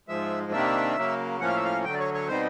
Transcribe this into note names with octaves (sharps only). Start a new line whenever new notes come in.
G#2 F3 G#3 E5
C3 D#3 G3 A#3 D4 E5
C#3 F#3 A#3
A2 F3 A#3 C#4 F#5
F5
E5
F5
D2 D3 F#3 G5
D5
C#5
C#5
B2 G3 C4 D#4 C5